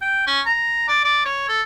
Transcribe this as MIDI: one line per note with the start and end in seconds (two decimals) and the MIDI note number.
0.02 0.26 79
0.27 0.41 61
0.46 0.84 82
0.88 1.02 74
1.04 1.23 74
1.25 1.47 73
1.49 1.62 69